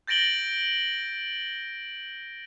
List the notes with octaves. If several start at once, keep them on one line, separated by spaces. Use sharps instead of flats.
G6 A6 A#6 D7 F#7 G7